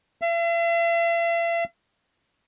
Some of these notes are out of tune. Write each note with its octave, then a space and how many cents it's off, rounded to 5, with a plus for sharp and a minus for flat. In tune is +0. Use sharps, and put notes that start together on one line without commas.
E5 +45